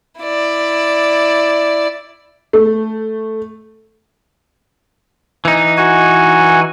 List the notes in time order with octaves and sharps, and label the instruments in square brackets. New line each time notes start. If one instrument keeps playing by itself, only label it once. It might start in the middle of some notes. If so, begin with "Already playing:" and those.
[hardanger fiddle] E4 D5
[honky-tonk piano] A3
[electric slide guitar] E3 D#4
[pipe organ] F#4 G#5